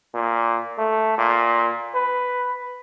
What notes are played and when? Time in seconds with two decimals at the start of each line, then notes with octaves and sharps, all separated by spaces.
0.14 A#2
0.78 A3
1.18 A#2
1.95 B4